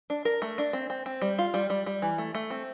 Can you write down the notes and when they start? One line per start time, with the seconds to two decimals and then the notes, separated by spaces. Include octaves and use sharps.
0.10 D4
0.25 A#4
0.42 A3
0.58 D4
0.73 C4
0.90 C4
1.06 C4
1.22 G3
1.39 F4
1.54 G3
1.70 G3
1.86 G3
2.02 E3
2.18 A3
2.35 A3
2.50 C4